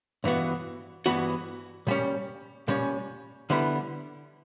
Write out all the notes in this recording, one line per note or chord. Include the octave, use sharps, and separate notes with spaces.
G2 E3 B3 F#4
G2 E3 B3 F#4
A#2 G3 C#4
A#2 G3 C#4
D3 G3 B3 E4